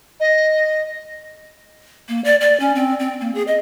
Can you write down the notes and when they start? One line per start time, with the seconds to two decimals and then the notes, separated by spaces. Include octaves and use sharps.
0.20 D#5
2.09 A#3
2.25 D5
2.41 D5
2.60 C#4
2.75 C4
2.99 C4
3.21 A#3
3.35 G#4
3.47 D#5